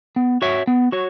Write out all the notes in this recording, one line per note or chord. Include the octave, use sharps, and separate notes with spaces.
B3
F#4 C#5 E5
B3
F#4 C#5